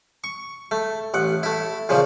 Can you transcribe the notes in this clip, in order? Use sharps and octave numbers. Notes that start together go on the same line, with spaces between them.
C#6
A3
A1 F#5
A3 E4
A#2 C#3 F3